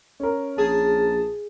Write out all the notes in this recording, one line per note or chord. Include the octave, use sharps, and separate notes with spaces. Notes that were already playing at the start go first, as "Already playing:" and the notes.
C#4 A#4
A#1 G#4 A5